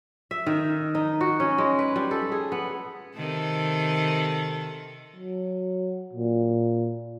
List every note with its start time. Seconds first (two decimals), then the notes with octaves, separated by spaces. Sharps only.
0.31 E5
0.46 D#3
0.95 D#4
1.21 F#4
1.40 C#4
1.58 G#3
1.79 B4
1.96 G3
2.11 A4
2.32 G#4
2.52 B3
3.16 C3 D#3 A4
5.16 F#3
6.13 A#2